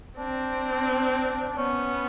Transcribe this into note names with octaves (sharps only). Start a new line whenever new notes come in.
C4 D4
B3 C#4